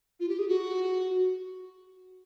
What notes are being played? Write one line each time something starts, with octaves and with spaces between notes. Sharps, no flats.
F4
G4
G#4
F#4